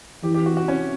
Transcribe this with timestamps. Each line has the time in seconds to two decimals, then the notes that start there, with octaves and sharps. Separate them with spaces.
0.23 E3 G4
0.34 G4
0.46 F#4
0.57 F#4
0.68 C#4